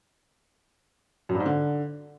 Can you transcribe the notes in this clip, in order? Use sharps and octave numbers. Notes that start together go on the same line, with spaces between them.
F#2
G2
G#2
D3